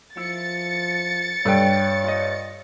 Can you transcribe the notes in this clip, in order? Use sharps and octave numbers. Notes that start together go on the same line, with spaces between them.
F3 E4 A6 C#7
G2 A4 B4 C#5 G5
F4 D#5